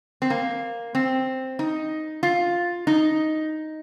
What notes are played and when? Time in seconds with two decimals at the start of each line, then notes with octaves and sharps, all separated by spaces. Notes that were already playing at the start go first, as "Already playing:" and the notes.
0.22 C4
0.30 A#3
0.95 C4
1.59 D#4
2.23 F4
2.87 D#4